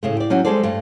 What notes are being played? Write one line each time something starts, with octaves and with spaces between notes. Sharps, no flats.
A2 C#3 A3
G4 D5
E3 F#3 G3 C#4 D#4
G3 G#3 G#4 A4 C5 D5
G2 A3